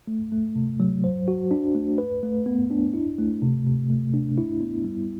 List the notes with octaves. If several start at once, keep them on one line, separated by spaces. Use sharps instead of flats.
A3
A3
C3
F#3
C5
F#4
D4
A3
B4
A3
B3
D4
E4
A3
C3
C3
A3
D4
E4
B3
G3